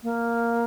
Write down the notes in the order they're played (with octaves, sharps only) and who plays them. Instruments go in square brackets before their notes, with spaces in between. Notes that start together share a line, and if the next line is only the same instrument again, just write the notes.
[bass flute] A#3